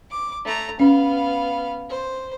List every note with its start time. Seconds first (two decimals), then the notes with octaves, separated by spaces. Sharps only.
0.11 D6
0.45 A3 A#5
0.80 B3 C#4 F5
1.90 C5